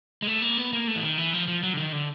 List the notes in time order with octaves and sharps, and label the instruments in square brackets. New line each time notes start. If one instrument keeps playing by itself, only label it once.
[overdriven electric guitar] G#3
A3
A#3
B3
A#3
A3
E3
D#3
E3
F3
F3
F#3
D3
D#3
D3